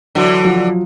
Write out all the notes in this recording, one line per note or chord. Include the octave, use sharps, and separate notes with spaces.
D3 E3 F#3
F3